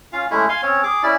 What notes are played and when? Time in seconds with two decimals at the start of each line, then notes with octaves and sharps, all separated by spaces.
0.13 C#4 F4 F5
0.30 G#3 A3 C#4 E4
0.49 F5 G#5 C6
0.62 C4 C#4 C#5
0.83 G#4 D6
1.03 C#4 E4 D5